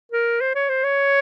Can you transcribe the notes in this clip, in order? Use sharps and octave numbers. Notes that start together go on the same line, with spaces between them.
A#4
C5
C#5
C5
C#5